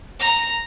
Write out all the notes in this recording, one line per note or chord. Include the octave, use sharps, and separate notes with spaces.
A#5